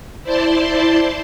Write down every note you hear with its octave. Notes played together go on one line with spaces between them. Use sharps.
E4 C5 D5 A5 C6